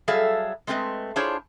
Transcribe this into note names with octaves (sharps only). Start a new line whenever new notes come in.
F#3 G3 G#4 A4 E5 F5
G#3 A3 C4 A4 B4 D#5
D4 E4 F4 G#4 C5 C#5